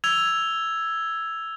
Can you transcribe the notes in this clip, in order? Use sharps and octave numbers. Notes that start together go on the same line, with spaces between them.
E6 G#6 F7